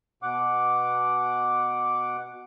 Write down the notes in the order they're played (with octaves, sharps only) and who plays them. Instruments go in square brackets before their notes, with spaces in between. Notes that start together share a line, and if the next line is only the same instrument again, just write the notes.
[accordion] B2 F#5 D6